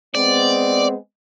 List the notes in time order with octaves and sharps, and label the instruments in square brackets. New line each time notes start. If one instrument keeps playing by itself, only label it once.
[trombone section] G#3 B3 C4 [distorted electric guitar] D5